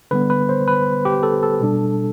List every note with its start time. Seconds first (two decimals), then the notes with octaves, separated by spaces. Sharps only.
0.11 D3 G3 B3 B4
0.30 B4
0.49 C5
0.67 B4
1.05 G4
1.23 A4
1.43 A4
1.60 B2 G3 D4